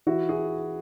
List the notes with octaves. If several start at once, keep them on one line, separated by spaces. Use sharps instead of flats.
E3 E4 F#4
F#4 G#4